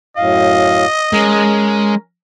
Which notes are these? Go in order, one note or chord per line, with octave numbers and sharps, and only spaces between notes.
F#2 A2 D#5 F5
G#3 C#4 A#4